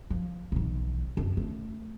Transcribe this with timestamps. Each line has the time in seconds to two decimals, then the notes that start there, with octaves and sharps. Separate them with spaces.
0.10 F3
0.52 B1 E3
1.17 F#2
1.37 A3